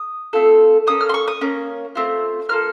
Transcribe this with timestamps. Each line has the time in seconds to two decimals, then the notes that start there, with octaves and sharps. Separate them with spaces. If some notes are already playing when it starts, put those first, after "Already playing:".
Already playing: D#6
0.33 A3 C4 F4 A4
0.87 A#3 C#4 A4 D#6
1.01 F6
1.09 C6
1.14 C#6
1.28 D#6
1.41 A#3 C#4
1.95 A3 C4 F4
2.49 A#3 F4 A4 F6